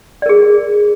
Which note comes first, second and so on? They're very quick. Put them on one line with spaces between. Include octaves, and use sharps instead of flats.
D5 A#4 G#4